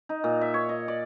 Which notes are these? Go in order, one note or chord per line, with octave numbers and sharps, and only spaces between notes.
D#4
A#2
E5
C#5
D#5
D5